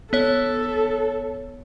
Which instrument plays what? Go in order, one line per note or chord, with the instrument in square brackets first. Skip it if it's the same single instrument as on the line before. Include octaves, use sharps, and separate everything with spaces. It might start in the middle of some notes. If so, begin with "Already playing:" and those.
[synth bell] B3 C#5 [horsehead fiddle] A4